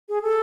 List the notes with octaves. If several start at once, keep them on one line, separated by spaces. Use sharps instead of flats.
G#4
A4